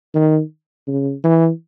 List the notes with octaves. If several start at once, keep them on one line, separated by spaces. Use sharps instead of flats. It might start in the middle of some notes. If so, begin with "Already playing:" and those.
D#3
C#3
E3